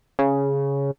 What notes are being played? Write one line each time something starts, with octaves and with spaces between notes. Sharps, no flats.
C#3